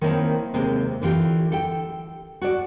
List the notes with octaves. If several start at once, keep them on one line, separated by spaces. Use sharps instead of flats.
D#3 A#3 C4 E4 C#5 A5
D#2 C3 G#3 A#3 C4
D3 E3 F4 G4
A4 G5
F#4 A4 D5